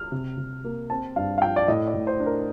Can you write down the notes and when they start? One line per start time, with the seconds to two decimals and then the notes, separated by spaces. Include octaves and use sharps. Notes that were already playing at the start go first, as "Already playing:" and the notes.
Already playing: F6
0.12 C3
0.38 C3
0.64 A#3
0.90 C4 A5
1.16 G2 F5
1.38 F5
1.42 F3 G5
1.56 D5
1.68 A2 D#5
1.87 D5
1.94 A2
2.07 C5
2.20 D4
2.26 A#4